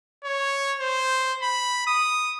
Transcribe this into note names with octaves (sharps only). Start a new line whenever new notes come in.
C#5
C5
B5
D#6